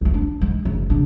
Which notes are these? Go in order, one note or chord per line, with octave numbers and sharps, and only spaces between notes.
C#2 A3
D4
G#3
F#1
C#3 D4